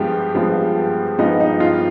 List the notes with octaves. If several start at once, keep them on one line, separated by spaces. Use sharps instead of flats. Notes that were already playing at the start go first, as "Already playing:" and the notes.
Already playing: G2 F3 G#3 B3 G4
G2 F3 G#3 B3
G2 F3 G#3 B3 D#4
D#4
F4